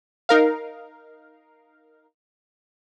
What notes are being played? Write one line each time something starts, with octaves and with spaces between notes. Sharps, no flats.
D#4 A#4 F5